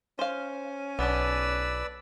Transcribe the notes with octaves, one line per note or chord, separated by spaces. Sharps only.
C#4 C5 F5
B1 B3 D4 B4 D5 E6